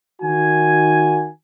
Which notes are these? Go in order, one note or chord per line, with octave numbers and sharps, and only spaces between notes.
D#3 F#4 G#5